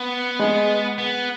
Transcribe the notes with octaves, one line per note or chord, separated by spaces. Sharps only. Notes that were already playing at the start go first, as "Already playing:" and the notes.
Already playing: B3
G#3
B3